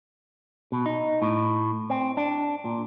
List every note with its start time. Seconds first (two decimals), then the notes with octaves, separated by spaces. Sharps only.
0.72 B2
0.86 D#4
1.22 A2
1.90 C4
2.17 D4
2.65 A#2